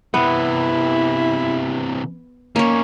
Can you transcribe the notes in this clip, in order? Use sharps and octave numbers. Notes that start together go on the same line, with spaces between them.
C3 E3 B3 E4
A#3 C#4 D#4 C#5